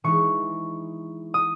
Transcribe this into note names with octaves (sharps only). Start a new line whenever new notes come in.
E3 G#3 D#4 C#6
D#6